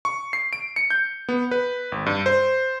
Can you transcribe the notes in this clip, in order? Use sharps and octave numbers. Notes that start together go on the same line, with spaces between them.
C#6
C7
D7
C#7
G6
B3
B4
G#1
G2
C5